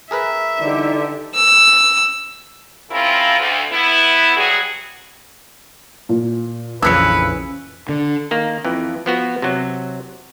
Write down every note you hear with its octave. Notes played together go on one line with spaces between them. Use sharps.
G#4 A#4 B4 E5
D3 E3 G3 D#4 G4
E6
C#3 C4 E4 F4 A#4
D2
B3 E4
F#3 G3 F#4 G#4
A#2
A#1 F2 C#3 E3 C#4 B4 E6 C#7
D3
D#3 A#3
F2 E3
F3 B3 F#4
C3 F#3